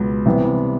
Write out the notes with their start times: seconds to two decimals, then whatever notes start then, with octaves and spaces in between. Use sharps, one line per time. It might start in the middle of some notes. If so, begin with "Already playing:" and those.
Already playing: C#2 B2 F#3 B3
0.26 C3 E3 G3 B3